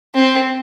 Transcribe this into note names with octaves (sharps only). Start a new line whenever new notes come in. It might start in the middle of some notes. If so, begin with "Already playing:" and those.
C4